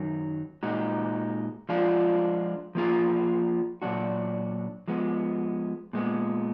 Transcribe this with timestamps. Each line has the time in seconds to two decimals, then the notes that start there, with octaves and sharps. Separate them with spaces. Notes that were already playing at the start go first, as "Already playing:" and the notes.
Already playing: F#2 D#3 F#3
0.63 A#2 G#3 D#4 F#4
1.69 F3 G#3 D4 F4
2.75 F3 A#3 F4 G#4
3.82 A#2 F#3 D4 F#4
4.88 F3 G#3 B3
5.93 A#2 G#3 B3